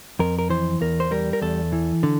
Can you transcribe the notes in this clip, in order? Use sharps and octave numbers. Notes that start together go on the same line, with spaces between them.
F2 A#4
A#4
E3 C5
E2 A#4
C5
G3 A#4
A#4
E2 A4
E3
D3